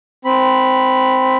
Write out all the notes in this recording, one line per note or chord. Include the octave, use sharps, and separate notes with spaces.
C4 B5